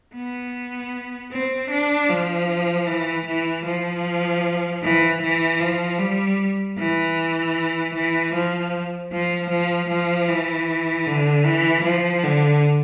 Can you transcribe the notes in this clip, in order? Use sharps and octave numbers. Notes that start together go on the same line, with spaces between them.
B3
C4
D4
F3
E3
E3
F3
E3
E3
F3
G3
E3
E3
F3
F3
F3
F3
E3
D3
E3
F3
D3